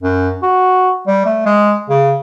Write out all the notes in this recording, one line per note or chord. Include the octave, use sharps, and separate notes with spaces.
F#2
F#4
G3
A3
G#3
C#3